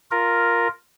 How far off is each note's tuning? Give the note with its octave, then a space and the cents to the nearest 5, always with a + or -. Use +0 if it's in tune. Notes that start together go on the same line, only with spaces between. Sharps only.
F4 +0 A#4 +0